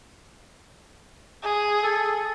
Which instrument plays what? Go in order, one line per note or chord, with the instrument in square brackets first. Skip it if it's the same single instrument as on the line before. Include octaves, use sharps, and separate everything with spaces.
[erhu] G#4
[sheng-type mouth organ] A4